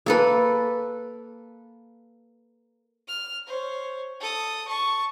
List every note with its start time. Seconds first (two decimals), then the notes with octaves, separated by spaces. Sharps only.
0.06 A#3 A4 B4
3.08 F6
3.46 C5 C#5
4.20 A4 D#6
4.68 A5 C#6